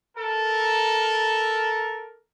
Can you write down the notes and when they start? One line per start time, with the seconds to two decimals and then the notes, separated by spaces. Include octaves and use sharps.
0.16 A4 A#4